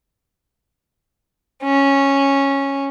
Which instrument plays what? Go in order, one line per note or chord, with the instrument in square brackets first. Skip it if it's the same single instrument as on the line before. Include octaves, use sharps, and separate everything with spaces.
[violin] C#4